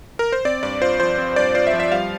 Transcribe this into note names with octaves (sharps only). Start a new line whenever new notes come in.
A#4
C5
C4 D5
G2 D5
F4 C5
F3 C5
C4
G2 D5
F4 C5
E5
F3
E5
G3 F5